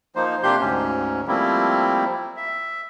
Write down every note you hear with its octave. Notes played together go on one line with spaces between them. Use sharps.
F3 A#3 D#4 C5
C3 A#3 D4 G4 C6 G6
D2 G#2 C#4
F3 G3 A3 A#3 C4 E4
E5